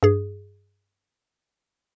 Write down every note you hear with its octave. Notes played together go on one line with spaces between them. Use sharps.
G2 G#4